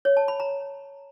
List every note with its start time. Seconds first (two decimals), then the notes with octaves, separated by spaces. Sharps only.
0.05 C#5
0.17 A5
0.28 B5
0.40 A#5